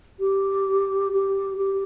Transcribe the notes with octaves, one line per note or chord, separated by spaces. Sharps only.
G4
G4
G4